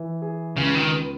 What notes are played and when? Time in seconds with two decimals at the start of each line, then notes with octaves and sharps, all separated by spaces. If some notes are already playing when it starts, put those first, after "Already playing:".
Already playing: E3
0.22 G#4
0.57 C#2 C#3
0.75 D#3
0.92 B3